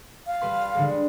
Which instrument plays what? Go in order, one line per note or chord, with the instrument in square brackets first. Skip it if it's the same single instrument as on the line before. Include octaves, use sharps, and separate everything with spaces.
[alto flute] F5
[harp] G3 B4 C6
D3 G3 G#3